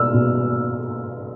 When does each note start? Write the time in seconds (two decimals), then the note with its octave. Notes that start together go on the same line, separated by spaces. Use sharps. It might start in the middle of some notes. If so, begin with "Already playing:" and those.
Already playing: B2 E6 F6
0.14 B2